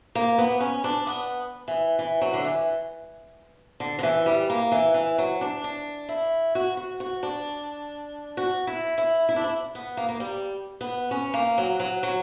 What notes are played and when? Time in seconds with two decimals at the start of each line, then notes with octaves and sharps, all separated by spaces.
0.15 A#3
0.38 B3
0.60 C#4
0.84 D4
1.07 B3
1.68 E3
1.99 E3
2.21 F#3
2.33 D3
2.44 E3
3.80 D3
3.99 D3
4.03 E3
4.26 G3
4.50 A#3
4.72 E3
4.94 E3
5.18 F#3
5.41 D4
5.64 D4
6.09 E4
6.55 F#4
6.77 F#4
7.00 F#4
7.23 D4
8.37 F#4
8.67 E4
8.98 E4
9.29 E4
9.36 D4
9.44 E4
9.75 B3
9.97 A#3
10.09 A#3
10.20 G3
10.81 B3
11.11 C#4
11.34 A#3
11.58 F#3
11.80 F#3
12.03 F#3